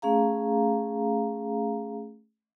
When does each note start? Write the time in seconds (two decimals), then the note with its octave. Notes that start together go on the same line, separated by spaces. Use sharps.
0.02 A3 C#4 G#4 F5 A#5